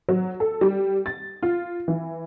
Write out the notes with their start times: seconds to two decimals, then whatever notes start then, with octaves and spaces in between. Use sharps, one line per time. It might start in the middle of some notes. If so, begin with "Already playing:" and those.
0.09 F#3
0.40 A4
0.61 G3
1.06 A6
1.43 F4
1.88 E3